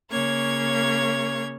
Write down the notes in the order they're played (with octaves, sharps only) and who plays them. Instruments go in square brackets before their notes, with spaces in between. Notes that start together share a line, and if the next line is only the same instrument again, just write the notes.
[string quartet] C#3 A#3 C#5 G#6